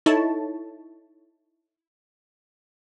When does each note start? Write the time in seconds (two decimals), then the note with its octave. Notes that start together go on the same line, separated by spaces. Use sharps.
0.06 D#4 E4 A4 C#5 A5